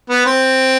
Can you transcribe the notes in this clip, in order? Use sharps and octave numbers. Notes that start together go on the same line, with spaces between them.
B3
C4